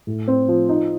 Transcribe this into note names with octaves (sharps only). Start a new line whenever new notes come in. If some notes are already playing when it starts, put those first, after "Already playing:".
A2
C4
F3
D#4